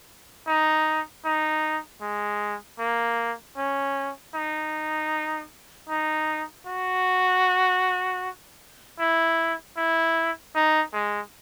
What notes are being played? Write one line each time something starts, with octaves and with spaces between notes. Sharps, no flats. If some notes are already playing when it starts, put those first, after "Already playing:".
D#4
D#4
G#3
A#3
C#4
D#4
D#4
F#4
E4
E4
D#4
G#3